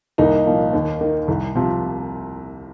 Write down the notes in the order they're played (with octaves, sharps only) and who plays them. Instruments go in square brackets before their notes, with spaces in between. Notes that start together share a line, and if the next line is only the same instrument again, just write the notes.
[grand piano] C2 A#3 D#4
A#2 F3
D#2
D#3
C2
C3 F3